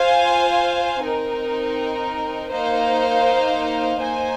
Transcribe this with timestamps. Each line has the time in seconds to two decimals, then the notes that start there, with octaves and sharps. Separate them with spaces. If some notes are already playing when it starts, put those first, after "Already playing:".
Already playing: F4 C5 F5 G#5
1.02 C4 D#4 A#4
2.52 A#3 D#4 C5 F5
4.01 A#3 D#4 C5 G#5